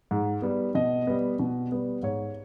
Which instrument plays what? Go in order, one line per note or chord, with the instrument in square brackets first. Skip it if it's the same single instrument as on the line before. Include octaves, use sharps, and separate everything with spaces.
[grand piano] G#2
G3 B3
B2 D#5
G3 B3
B2
G3 B3
G#2 C#5